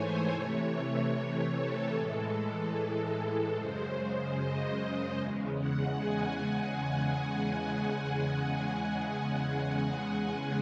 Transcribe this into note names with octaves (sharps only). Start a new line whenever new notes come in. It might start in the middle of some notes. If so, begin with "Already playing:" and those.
Already playing: G#2 E3 A3 C5 C#5 G#5
C3 E3 A3 C#5
C#5
A4
A2 E3 G#3
F#2 C#3 G#3 C5
D#5
E2 C#3 G#3
F#5
G#5